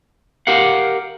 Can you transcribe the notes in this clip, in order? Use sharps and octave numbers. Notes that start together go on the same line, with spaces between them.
G4 A#4 F5 F#5